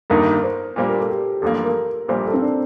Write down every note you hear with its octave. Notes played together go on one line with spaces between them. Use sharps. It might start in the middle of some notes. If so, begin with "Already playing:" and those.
G1 G2 D#3 A#3 D#4 A#4
C5
A#2 G3 A#3 D4 C5
A#4
A4
G4
A1 G2 F3 A#3 A4
A#4
A#1 A#2 G3 A#3 C5
A4
C4
D4